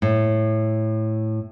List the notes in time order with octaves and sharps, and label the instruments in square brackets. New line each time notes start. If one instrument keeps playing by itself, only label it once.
[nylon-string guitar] A2